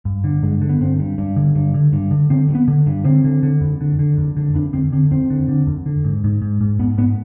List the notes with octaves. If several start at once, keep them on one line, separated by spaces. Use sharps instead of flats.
G2
D3
G2 G#3
D3
B3
G2 C4
G2
G2
D3
G2
D3
G2
D3
D3 C4
G2
B3
D3
G2
D3 C4
D3
D3
F2
D3
D3
F2
D3
F2 D4
D3 C4
D3 C4
F2 C4
D3
D3
F2
D3
G#2
G#2
G#2
G#2
G#2 B3
G#2 B3